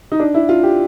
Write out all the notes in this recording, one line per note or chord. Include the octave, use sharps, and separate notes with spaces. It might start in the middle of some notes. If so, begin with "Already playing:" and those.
D#4
D4
E4
F4
G4